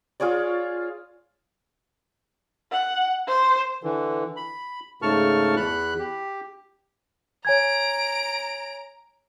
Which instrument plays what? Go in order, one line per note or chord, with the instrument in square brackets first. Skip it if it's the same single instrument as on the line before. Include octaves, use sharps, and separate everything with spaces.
[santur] F4 G#4 C#5 D5
[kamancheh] F#5
C5
[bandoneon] D3 E3
B5
G#2 C#3 A3 A5 C#6 F6
E2 B5 F#6
G4
[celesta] C#5 G#5 G#6 [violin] A#5 D7